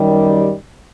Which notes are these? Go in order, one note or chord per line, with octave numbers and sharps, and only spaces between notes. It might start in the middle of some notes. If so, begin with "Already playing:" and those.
Already playing: F#2 D#3 G3